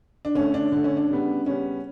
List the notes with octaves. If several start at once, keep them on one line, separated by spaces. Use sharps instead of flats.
D4
D3 A3 C#4
D4
D3 A3
C#4
D4
C#3 G3 B3
C#3 G3 B3 C#4